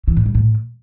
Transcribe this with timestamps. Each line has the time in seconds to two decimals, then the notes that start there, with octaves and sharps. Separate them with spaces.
0.08 E3
0.17 A2
0.26 G3
0.35 A2